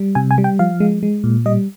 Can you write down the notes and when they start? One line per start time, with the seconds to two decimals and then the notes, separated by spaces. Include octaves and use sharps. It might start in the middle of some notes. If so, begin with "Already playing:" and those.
Already playing: G3
0.15 C3 G#5
0.31 G#5
0.38 G3
0.44 G5
0.59 F3 F5
0.80 G#3
1.03 G#3
1.24 A#2
1.46 G3 D#5